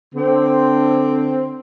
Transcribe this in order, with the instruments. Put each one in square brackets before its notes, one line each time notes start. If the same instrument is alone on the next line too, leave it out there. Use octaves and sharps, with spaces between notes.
[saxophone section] D3 C4